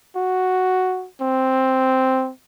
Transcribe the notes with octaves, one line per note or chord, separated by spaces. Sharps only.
F#4
C4